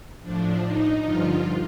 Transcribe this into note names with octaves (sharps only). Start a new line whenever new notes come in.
A2 F3 D4
D#4
G2 D3 F3 F4